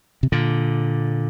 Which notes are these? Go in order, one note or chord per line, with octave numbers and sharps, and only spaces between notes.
C3
A#2 D3